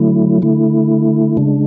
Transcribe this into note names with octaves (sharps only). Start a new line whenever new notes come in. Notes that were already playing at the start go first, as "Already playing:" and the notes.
Already playing: D3 F#3 A3 E4
D3 A3 E4
C#3 G#3 D4